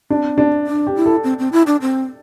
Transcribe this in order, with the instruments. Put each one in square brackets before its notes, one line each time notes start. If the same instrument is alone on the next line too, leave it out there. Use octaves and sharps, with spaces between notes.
[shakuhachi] C4 [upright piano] D4
[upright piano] D4
[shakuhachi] D4
[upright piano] G4
[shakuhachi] E4
[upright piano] A4
[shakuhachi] C4
C4
E4
D4
C4